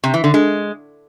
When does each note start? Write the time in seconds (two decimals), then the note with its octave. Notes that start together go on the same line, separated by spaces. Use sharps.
0.04 C3
0.14 E3
0.24 D3
0.34 G#3